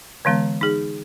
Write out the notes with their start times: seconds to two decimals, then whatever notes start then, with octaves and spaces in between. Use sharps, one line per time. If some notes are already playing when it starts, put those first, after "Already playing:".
0.25 D3 E3 G#3 B3
0.61 D#4 G#4